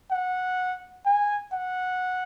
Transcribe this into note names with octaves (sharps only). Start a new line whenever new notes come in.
F#5
G#5
F#5